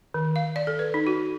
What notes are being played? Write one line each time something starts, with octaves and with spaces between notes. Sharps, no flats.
D#3
F5
D5
A4
B4
D#4
F#4